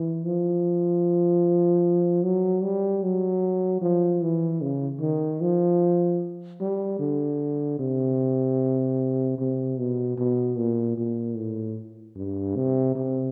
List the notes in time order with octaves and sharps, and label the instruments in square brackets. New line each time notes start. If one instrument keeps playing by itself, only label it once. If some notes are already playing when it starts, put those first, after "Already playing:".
Already playing: [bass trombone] E3
F3
F#3
G3
F#3
F3
E3
C#3
D#3
F3
G3
D3
C3
C3
B2
B2
A#2
A#2
A2
G2
C3
C3